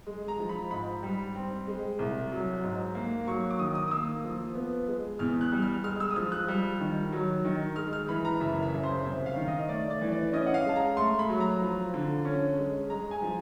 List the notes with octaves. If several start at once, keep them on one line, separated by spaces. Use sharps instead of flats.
G#3
A#5
F3
B5
G#2 B5
G3
C4
G#3
C2
F#3
G#2
A#3
F#3 C#6
D6
D#3 D#6
D#6
D#6
A#3 E6
F3
B3
G#3
E2 F6
F#6
G3
F6
G#3 F6
E6
D#6
F3 E6
F#6
G3
D#3
F#3
D#3
G#3 F6
F6
E3 B5
A#5
F#1 E5
E5
C#3
C5
C2 E5
F5
D#3
D#5
A3 D5
D5
E3
D5
C#4 D#5
F#5
F5
G#3 A5
A#5
A3 C6
B5
F#3
A#5
F3
D3
C#4
G#3
G#3 A#5
G#5
F3